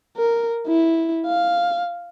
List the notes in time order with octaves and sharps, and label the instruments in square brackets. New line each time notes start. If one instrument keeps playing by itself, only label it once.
[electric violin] A#4
E4
F5